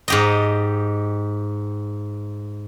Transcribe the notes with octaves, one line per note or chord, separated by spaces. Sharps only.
G#2 G4 D#5